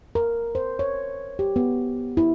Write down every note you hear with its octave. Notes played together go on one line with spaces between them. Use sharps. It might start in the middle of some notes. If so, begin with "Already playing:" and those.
A#4
C5
C#5
G4
B3
E4